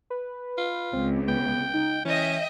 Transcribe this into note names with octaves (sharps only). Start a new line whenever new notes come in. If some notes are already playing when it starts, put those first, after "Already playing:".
B4
F4
C#2 C#3 C4
B3 G5
D#4
E3 C#4 D#5 E5 G5